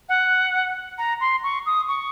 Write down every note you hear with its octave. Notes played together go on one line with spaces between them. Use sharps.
F#5
A#5
C6
C#6
D#6
C#6